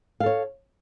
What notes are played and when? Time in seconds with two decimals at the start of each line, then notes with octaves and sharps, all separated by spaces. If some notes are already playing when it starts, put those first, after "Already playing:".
0.20 F5
0.23 A4
0.26 C#5